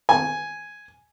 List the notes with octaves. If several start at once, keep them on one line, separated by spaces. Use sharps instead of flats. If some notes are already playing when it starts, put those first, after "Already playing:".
G#5